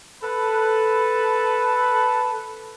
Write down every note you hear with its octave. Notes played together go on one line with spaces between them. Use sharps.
A4 B4